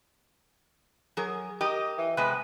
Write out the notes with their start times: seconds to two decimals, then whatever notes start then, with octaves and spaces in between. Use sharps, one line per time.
1.17 F#3 G#4 A#4
1.61 G4 A#4 D#5
1.98 E3
2.17 C3 G#3 B3 B4